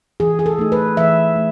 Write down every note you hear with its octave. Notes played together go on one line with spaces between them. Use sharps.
E3 G#4
G#4
A4
A3 D#4
B4
E3 E5
A3